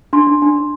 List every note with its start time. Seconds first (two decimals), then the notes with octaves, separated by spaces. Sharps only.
0.13 D4 C6
0.27 D4
0.42 D4
0.56 D4